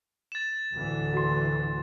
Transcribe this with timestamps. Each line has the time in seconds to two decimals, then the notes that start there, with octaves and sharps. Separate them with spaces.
0.32 A6 E7
0.72 D2 A2 D3 E3
1.13 F#4 C6